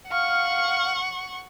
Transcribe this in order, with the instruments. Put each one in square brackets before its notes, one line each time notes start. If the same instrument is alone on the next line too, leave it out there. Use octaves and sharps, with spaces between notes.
[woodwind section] F5 F6 [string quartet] F#5 C#6